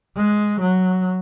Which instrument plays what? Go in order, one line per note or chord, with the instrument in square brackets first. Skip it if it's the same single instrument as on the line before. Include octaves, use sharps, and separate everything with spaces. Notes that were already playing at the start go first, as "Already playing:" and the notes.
[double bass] G#3
F#3